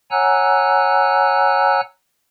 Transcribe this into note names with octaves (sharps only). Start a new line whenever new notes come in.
C#5 F#5 G#5 A#5 E6 F#6